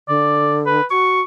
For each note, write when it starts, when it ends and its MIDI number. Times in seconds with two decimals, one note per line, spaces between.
0.08 0.81 50
0.08 0.57 74
0.66 0.84 71
0.90 1.21 66
0.90 1.22 85